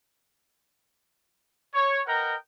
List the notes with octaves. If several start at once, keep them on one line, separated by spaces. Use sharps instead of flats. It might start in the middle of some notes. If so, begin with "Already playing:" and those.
C#5
A#4 B4 D#5 F#5 G5 A#5